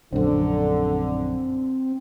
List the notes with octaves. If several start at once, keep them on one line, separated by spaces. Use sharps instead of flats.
A#1 F#2 D3 C4